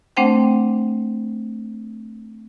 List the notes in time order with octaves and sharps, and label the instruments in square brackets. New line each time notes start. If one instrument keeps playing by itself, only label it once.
[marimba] A3 C4 D4 C5 F#5 G5